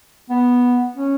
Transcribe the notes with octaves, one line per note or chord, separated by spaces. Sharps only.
B3
C#4